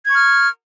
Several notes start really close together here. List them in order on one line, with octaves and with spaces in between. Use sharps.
G#6 C#6 F6